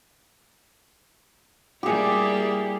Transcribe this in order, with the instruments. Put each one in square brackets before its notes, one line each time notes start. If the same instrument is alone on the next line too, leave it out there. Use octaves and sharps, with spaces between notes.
[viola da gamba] G3 A#3 E4 [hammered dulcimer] G4 G#4